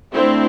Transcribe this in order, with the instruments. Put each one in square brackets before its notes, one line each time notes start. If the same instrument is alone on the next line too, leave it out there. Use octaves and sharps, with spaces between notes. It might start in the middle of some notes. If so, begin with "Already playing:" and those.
[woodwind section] D3 A3 D4 [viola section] C4 E4